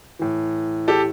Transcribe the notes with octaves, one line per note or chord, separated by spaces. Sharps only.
A2 E3
G4 A4